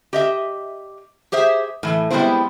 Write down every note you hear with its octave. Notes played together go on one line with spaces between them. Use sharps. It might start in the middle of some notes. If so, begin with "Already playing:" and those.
G4 D#5 E5
G4 G#4 C5 E5
A2 E3
G3 G#3 B3 C4 E4 C5